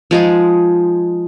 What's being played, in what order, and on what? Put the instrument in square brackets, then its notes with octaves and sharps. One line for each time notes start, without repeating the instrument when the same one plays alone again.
[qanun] F3 G#3 D#4 G#4